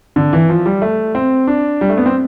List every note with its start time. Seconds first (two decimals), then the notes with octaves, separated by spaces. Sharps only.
0.16 D3
0.33 E3
0.49 F3
0.66 G3
0.82 A3
1.15 C4
1.47 D4
1.81 G3
1.90 A3
1.98 B3
2.06 C4